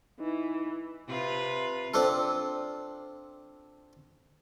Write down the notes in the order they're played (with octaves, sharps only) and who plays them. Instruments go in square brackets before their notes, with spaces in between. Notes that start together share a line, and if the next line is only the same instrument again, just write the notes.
[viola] E3 [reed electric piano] D#4
[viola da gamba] C3 F4 B4
[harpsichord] C4 D4 F4 A4